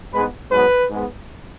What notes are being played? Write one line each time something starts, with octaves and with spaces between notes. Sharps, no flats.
G#2 G#3 B3 B4
G#2 F#3 B3 B4
G#2 G#3 B3